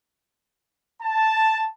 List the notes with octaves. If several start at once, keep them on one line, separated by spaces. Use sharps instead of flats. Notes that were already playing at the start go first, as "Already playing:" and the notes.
A5